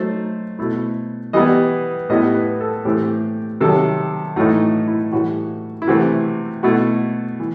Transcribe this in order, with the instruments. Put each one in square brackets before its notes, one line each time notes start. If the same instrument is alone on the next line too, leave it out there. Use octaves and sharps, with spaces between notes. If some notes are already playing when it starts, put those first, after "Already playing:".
Already playing: [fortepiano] F#3 A3 D#4 C5
B2 A3 E4
E3 G3 B3 E4 D#5
A2 G3 B3 E4 D#5
B4
A4
A2 E3 A3 C4 G4
C3 D#3 F#3 A4
A2 E3 A3 D#4 F#4
E4
A2 E3 G3 F#4
E4
C3 E3 A3 C4 F#4
B2 A3 E4 F#4
E3